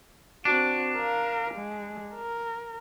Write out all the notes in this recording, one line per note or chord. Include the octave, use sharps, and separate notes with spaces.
C4 D4 F#4
A#4 F5
G#3
A#4